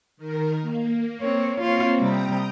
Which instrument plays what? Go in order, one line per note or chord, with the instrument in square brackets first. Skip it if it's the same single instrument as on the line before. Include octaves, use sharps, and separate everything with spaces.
[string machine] D#3 A#4
A#3
[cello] C4 C#5
[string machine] A#3 C4 [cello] F4 C#5
[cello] C3 G3 [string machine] G5 A#5 D#6